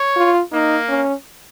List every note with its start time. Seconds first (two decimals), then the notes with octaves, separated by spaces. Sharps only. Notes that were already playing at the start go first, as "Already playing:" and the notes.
Already playing: C#5
0.16 F4
0.52 A#3 D#4
0.88 C#4